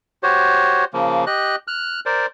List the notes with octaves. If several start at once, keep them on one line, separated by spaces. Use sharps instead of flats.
F#4 G4 C5 C#5
C#3 F3 A#3
G4 D#5 F#6
F6 F#6
A#4 C5 D5